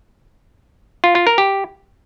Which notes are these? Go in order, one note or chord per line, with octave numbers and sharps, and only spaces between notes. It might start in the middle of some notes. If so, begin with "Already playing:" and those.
F4
F4
A#4
G4